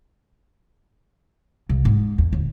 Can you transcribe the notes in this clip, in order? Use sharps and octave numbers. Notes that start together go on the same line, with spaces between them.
C2
G#2
E2
D1